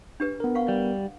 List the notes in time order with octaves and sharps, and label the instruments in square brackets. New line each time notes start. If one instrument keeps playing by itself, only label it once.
[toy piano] D4 G4 B4
[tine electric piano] B3 A#4
[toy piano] F5 F#5 C#6
[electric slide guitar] G3